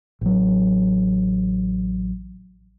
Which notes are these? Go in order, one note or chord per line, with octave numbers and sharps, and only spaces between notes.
A1 F#3